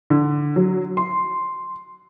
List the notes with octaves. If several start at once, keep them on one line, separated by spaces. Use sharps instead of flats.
D3
F#3
C6